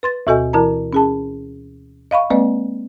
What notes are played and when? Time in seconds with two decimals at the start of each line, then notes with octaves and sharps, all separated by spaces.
0.03 B4 C6 A6
0.27 D2 B2 F#4 A4 D#5 G#5
0.53 E3 E4 A#4 A5 A#5
0.93 C#4 G#4 A5
2.11 D#5 F5 B5 C#6
2.30 G#3 A#3 C4 B4 D5 D#5